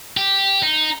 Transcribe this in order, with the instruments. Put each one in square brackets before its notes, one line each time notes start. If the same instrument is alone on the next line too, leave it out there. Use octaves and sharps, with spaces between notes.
[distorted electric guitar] G4
D#4